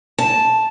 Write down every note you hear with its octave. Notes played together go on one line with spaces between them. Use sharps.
A5